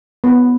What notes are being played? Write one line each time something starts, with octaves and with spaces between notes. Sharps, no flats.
B3